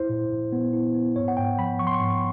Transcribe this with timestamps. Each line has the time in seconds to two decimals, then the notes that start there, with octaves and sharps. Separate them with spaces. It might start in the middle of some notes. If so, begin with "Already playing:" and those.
Already playing: E4 C5
0.09 A#2
0.30 A#2
0.52 B3
0.73 E4
0.94 B3
1.16 G#2 C#5
1.28 F#5
1.37 G#2 G5
1.59 F3 B5
1.79 F3 C#6
1.87 C6
1.94 C#6
2.01 G#2